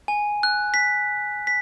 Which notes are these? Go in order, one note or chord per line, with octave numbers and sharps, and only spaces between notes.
G#5
F#6
B6
B6